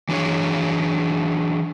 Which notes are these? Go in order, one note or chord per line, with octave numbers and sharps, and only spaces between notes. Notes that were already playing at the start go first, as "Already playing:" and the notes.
E3 F#3 D4 G#4 C#5